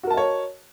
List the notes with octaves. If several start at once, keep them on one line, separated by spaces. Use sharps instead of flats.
F#4 A#4 C#5 D#5 A5